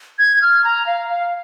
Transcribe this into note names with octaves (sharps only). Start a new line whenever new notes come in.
G#6
F6
A#5
F5
F5